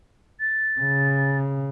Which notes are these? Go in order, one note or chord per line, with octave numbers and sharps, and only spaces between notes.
A6
C#3